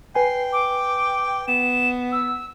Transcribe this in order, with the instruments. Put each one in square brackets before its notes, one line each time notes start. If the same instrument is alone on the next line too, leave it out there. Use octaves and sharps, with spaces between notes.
[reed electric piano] B4 G#5 [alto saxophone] G5 [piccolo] C7
[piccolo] D6
[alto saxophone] B3 [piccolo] E7
[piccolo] E6